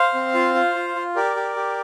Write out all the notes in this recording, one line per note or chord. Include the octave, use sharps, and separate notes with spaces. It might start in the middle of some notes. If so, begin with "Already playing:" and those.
Already playing: C5 F5
C4
F4
F4
F4
F4
G4 A#4 D5
G4
G4